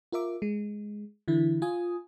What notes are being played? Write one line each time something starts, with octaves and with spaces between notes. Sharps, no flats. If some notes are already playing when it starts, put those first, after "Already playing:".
F4 A#4 E5 D6
G#3
D3 E3 E4
F4 G#5 D#6